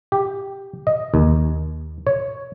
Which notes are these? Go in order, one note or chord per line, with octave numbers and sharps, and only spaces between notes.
G4
D#5
D#2
C#5